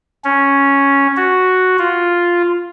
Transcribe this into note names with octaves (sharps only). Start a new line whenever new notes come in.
C#4
F#4
F4